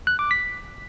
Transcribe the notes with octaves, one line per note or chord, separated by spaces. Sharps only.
F#6
D6
B6